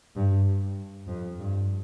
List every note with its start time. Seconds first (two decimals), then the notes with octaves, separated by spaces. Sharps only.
0.15 G2
1.08 F2
1.39 G2